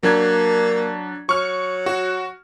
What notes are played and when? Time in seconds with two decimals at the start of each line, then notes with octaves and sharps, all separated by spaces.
0.03 F#3 A#3 D4 G#6
1.29 F#3 C#6 F6
1.86 F#4